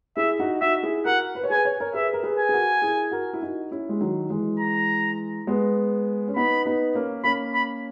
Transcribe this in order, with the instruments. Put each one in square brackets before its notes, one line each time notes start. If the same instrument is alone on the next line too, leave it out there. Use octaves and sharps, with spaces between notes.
[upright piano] E4 G#4 [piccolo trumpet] E5
[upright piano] D#4 F#4
[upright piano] D#4 F#4 [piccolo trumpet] E5
[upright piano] E4 G#4
[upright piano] F#4 A#4 [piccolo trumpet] F#5
[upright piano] B4
C#5
[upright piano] G#4 B4 [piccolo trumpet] G#5
[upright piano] C#5
A#4 C#5
[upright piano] G#4 B4 [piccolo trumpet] E5
[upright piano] A#4
G#4 B4
[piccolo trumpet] G#5
[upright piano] G#4
F#4 A#4
E4 G#4
F#4 A#4
E4
D#4 F#4
C#4 E4
G#3
D#3 F#3
E3 G#3
[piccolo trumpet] A#5
[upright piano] G#3 B3
C#4
[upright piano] B3 D#4 [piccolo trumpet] B5
[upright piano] B3 D#4
A#3 C#4
[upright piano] A#3 C#4 [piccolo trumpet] B5
[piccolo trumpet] B5